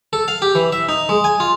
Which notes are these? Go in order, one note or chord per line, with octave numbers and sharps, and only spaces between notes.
A4
F5
G4
E3
E5
D#4
G#3
G#5
F4